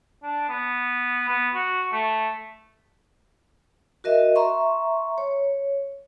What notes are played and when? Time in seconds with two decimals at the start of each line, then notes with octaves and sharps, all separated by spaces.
0.23 D4
0.49 B3
1.28 B3
1.54 F#4
1.92 A3
4.04 F#4 A#4 D#5 E5
4.36 E5 A#5 C6 C#6
5.18 C#5